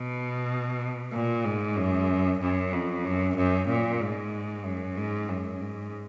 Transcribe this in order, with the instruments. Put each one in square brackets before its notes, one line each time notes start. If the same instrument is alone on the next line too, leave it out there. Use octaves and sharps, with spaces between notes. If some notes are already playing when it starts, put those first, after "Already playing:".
Already playing: [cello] B2
A#2
G#2
F#2
F#2
F2
F#2
F#2
A#2
G#2
F#2
G#2
F#2
G#2